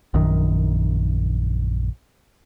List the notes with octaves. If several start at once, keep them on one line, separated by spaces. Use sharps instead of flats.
A#1 F#2 D#3